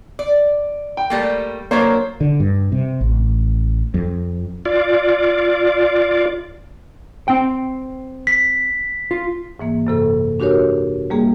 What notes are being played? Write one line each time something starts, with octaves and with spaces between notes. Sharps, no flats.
D5
G5
G3 A3 A#3
F#3 A#3 D4 C5 C#5
D3
G2
C3
A1
F2
F4 D5
C4 G5
B6
F4
G#2 E3 A#3
F#2 C3 A4
D4 F#4 G4 A#4 C#5
G3 A#3 G#4